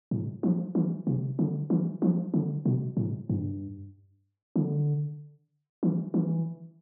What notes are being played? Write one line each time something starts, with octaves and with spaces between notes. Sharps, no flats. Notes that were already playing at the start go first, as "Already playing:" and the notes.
A2
F3
E3
C3
D3
E3
F3
D3
B2
A2
G2
D3
E3
E3